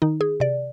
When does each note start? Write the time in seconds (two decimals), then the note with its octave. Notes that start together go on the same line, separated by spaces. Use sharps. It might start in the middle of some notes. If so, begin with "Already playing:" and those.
0.02 D#3 D#4
0.21 G#4
0.40 C3 D5